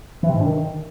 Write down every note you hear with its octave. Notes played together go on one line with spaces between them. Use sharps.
E3
C3
G#2
D4
D#3